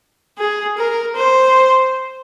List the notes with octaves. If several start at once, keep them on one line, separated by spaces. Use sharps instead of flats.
G#4
A#4
C5